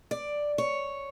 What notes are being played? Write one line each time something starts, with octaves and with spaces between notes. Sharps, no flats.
D5
C#5